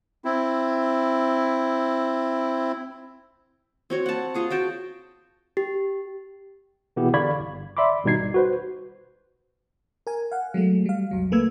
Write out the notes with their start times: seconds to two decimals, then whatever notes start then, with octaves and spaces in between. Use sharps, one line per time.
0.25 C4 E4
3.90 C4 F#4 C#5
4.06 F#5 A5
4.34 F4 G#4 F#5
4.50 F#4 G5 A5
5.57 G4
6.96 B2 E3 B3 E4 G4 G#4
7.14 D3 D5 F5 B5 C#6 G#6
7.40 G1
7.77 D5 E5 B5 C6 D6
8.04 G#1 B2 G3 D#4 G#6 C7
8.34 F#4 B4 C5
10.07 A#4 G#5
10.32 F5 F#5
10.54 F#3 G#3 A3
10.86 G3 F5
11.11 B1 F2 F#3
11.31 C#2 A3 A#3 B4 E6 G#6